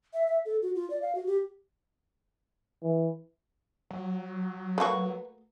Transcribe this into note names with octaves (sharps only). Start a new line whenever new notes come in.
E5
E5
A4
F#4
F4
D5
F5
F#4
G4
E3
F#3
A3 A#3 F#4 B4 C#6